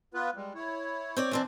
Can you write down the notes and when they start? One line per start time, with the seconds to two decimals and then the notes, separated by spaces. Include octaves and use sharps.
0.14 B3 F4 B4
0.35 G3 G#3
0.55 E4 C#5
1.17 C4 C#5 D5
1.31 E3 C4 D4